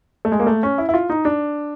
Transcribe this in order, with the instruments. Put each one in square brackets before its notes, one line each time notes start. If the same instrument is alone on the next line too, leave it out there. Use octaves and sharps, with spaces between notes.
[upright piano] A3
G#3
A#3
A3
C#4
E4
E4
F4
D#4
D4